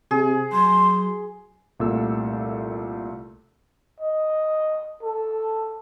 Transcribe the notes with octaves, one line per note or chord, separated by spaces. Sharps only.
C3 G#4
F#3 C6
C2 A#2 A3 A4 E6
D#5
A4